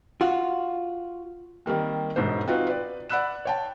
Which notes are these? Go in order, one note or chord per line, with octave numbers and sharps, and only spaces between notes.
F4 F#4
D#3 G3 A#3 C4
E1 G#2 B2 C5
C4 D#4 F4 F#4 B4
B4 D5
D5 F#5 B5 E6 F#6 E7
C#5 G5 A5